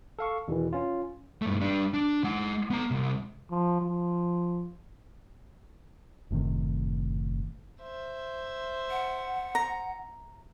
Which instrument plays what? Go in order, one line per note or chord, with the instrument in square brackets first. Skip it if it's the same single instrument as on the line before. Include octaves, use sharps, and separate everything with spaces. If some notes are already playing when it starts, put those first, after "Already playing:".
[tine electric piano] A4 F5 C#6
E2 B2 D#3 E3
C#4 F4
[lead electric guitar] G2 A3
G3 D4
D4
G#3 F#5
B3 A#5
C2
[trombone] F3
F3
[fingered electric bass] F#1 A2 C3 D#3
[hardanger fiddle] C5 E5
[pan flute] F#5
[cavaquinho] A#5